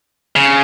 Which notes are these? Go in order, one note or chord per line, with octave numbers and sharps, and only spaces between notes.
C#3